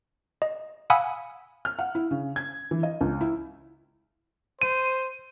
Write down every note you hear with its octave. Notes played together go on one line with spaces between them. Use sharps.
D#5
F5 F#5 G#5 B5 D#6 E6
F6
F#5
E4
C#3
G#6
E3
D#5
C#2
E4
C5 D#7